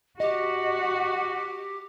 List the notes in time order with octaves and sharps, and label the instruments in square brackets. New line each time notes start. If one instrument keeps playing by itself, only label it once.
[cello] F#4 [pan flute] G4 [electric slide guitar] D#5